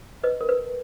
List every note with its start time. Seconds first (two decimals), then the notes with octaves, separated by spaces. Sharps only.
0.23 B4 D#5
0.41 A#4
0.49 B4